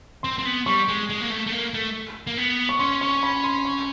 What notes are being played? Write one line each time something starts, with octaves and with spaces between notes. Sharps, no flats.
C4 C6
C4
B3
G3 C#6
G#3
G#3
A#3
A3
A3
A#3
A3
A#3
B3
C#6
C#4 C6
C#6
B5
C6
C#6